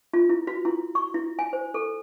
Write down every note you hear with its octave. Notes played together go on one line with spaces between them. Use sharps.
F4
E4
F#4
E4
C#6
E4
G#5
C5
A4